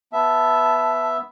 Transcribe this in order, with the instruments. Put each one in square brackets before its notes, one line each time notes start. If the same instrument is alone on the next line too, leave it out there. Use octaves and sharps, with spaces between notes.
[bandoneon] B3 E5 [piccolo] A5